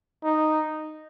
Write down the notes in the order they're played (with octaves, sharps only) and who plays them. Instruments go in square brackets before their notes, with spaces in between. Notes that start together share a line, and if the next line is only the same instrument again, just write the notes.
[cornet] D#4